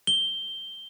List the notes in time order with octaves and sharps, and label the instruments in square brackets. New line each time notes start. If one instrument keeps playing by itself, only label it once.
[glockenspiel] G7